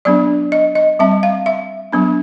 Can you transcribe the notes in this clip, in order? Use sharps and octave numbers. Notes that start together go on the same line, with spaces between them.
F#3 B3 D4 D5
D#5
D#5
G3 C4 E5
F5
E5
F#3 B3 D4